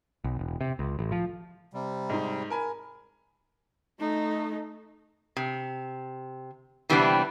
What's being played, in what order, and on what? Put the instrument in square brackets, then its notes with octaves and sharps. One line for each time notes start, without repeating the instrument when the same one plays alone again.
[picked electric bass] B1
E1
C3
C#2
A1
F3
[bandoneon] C3 G3
[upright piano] G#2 D#4
A#4 G#5 B5
[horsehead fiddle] A3 D#4
[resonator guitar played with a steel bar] C3
C3 E3 G3 B3 C4 D4